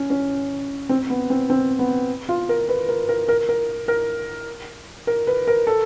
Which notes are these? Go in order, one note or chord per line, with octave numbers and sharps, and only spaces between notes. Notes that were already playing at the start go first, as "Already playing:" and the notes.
Already playing: C#4
C#4
C4
B3
C4
C4
B3
F4
A#4
B4
A#4
A#4
A#4
A#4
A#4
A#4
B4
A#4
A4